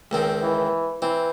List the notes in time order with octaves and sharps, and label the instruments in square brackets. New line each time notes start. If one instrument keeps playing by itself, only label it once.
[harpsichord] C#2 D#3 C4
[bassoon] E3
[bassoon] E3 [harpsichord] C4